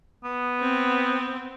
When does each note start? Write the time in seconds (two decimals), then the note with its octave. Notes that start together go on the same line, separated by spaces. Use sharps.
0.24 B3
0.60 C4